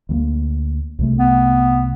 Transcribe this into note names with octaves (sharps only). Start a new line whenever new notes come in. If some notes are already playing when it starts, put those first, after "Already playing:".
D2 G3 A#3
C2 C3 A3
B3